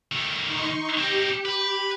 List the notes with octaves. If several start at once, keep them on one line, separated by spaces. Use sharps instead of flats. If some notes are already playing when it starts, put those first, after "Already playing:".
D#3 A3
D#4 C6 C#6
C4 D#4 G4
B4